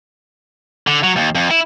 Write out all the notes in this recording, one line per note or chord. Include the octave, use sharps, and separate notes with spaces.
D3
F#3
D#2
F2
E4